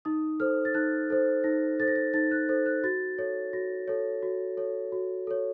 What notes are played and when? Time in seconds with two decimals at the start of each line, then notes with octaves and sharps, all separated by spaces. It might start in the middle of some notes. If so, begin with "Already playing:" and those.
0.05 D#4 D#6
0.40 A4 C5 F6
0.65 A6
0.74 D#4 F#6
1.10 A4 C5
1.44 D#4 A#6
1.80 A4 C5 A6
1.88 A#6
1.96 A6
2.14 D#4 A6
2.31 F#6
2.49 A4 C5
2.66 F#6
2.84 F#4 A6
3.18 A4 C#5
3.53 F#4 A#6
3.88 A4 C#5
4.23 F#4
4.57 A4 C#5
4.92 F#4
5.27 A4 C#5